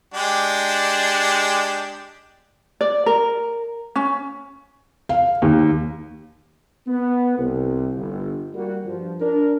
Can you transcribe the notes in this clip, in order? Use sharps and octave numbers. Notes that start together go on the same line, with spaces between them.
G#3 D4 G4
D5
A#4
C#4
F5
D#2
B3
C2
G1
G3 A#3 F#4
G2 F3
D4 A#4